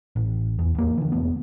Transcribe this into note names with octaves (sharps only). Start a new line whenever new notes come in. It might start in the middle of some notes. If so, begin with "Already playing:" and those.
A1
E2
E2 A#3
D3 E3
E1 A3 B3